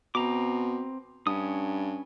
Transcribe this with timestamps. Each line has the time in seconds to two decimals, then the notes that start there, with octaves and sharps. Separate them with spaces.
0.15 B2 C4 A#5 D6
1.27 G2 C#4 D#6